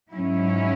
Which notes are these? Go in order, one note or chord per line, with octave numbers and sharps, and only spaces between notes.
G#2 F#3 C#4 E4